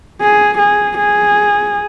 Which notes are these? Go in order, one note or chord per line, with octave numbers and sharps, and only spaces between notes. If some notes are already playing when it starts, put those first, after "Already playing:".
G#4
G#4
G#4